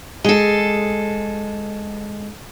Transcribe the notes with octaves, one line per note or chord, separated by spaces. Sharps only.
G#3 A4